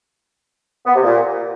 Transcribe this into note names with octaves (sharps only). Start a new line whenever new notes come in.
B3
C3
A#2